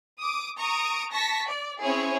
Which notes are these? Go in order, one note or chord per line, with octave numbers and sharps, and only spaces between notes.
D6 D#6
A#5 C#6 D#6 D7
A5 C#6 A#6 B6
D5
C4 C#4 E4 G#4 C#5